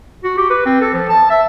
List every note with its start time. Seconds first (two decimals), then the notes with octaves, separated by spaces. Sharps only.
0.24 F#4
0.37 G4
0.50 B4
0.66 C4
0.81 A4
0.93 F3
1.09 A5
1.30 E5